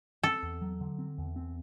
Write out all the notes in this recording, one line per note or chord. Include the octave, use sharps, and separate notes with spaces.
C4 A4
E2
F#3
D3
C4
E2
C4